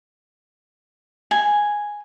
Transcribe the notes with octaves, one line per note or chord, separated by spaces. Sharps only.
G#5